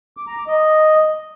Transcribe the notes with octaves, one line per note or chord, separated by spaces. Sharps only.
D6
A#5
D6
D#5